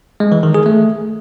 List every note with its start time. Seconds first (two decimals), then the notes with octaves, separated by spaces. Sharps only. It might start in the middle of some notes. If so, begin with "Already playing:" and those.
0.20 G#3
0.32 E3
0.43 D#3
0.55 G#4
0.66 A3